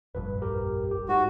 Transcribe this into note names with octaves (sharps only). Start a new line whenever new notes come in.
F1 A#1 G2 B4
G4 A#4
G4
G#2 F#4